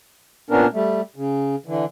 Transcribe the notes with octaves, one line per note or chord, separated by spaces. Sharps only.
A#2 B3 C#4 D4 A#4
G3 A3
C#3
D3 E3